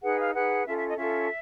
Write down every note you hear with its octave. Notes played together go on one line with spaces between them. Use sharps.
D#4 G#4 B4 F#5
F5
D#4 G#4 B4 F#5
C#4 F4 A4 E5
E5
D#5
C#4 F4 A4 E5